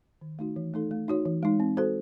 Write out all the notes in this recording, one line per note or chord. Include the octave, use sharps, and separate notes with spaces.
D#3
A3 D#4 F#4
E3
A3 D#4 A4
A3
D#4 F#4 C#5
E3
G#3 D#4
C4
F#4 A4 C5